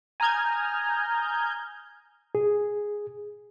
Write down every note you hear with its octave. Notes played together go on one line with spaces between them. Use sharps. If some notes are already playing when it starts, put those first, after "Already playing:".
G#5 A#5 D#6 F6 G6 G#6
G#4